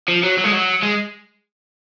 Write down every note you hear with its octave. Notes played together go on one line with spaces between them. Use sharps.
F3
F#3
F#3
G#3
F#3
G#3